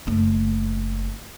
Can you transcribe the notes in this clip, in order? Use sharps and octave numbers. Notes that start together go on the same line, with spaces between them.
F#1 A3